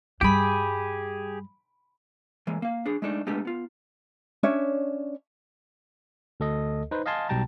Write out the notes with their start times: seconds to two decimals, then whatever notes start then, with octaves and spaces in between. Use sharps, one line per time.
0.21 G2 G3 G4 G#4 B5 D7
2.47 E3 G#3 A#3
2.62 A#3 F5
2.86 D4 G#4
3.02 G#3 A3 D4 D#4
3.27 G#3 A3 B3 D4 G4
3.45 B3 F4
4.43 C#4 D4 C#5 E5
6.40 D2 A4 D#5
6.91 D#4 B4 C5
7.06 D#5 F5 G#5 A5 C6
7.29 B1 B2 G3 G5 A5 A#5